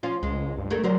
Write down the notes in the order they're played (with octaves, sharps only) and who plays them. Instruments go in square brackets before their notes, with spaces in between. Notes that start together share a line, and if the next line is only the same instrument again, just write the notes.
[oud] F3 C#4 F4
[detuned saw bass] C#2 [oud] G#3
[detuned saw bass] G2
[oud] A3 G#4 A#4
[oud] D3 A#4 C5 [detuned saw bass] F#3